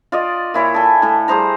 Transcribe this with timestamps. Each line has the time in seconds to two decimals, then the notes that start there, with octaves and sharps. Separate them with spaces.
0.12 F4 D5 D#5
0.54 A#2 E4 C#5 D6
0.74 A4 G#5
1.02 A2 A4
1.28 G3 G#4 C5 A#5